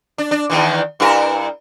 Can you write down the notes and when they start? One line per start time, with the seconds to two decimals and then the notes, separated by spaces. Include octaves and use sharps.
0.18 D4
0.31 D4
0.50 E2 D#3 E3
1.00 G2 E4 A#4